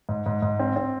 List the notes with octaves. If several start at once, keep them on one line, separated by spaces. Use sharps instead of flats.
G#2
G#2
G#2
C4
C4